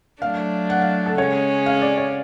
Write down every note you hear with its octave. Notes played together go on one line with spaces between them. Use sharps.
F#3 A3 D4 F5
F#5
F5
A4
C#3 G#3 C#4 C#5
F5
D5
C#5